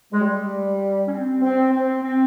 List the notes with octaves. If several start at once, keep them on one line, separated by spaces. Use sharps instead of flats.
G#3
G3
C#4
C4
C4
C4
C4